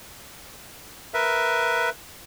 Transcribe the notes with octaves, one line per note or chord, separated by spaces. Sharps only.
A#4 B4 E5